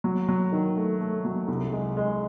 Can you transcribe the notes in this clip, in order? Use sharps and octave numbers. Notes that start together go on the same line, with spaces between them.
F#3
F#3
D#3
A3
A3
F#3
C2
G#3
G#3